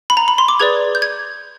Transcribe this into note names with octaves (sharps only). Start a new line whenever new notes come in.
B5
A#5
B5
C6
D6
G#4 B4 D5 G#6
G6
G#6